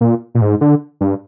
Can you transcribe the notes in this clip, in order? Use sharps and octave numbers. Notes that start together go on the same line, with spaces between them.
A#2
A#2
G#2
D3
G2